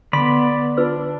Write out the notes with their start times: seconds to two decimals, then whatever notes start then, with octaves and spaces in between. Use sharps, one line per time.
0.13 D3 B3 D5 B5 C6
0.77 D4 F4 B4 E6